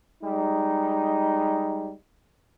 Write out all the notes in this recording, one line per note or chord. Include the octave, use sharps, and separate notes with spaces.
G3 G#3 D#4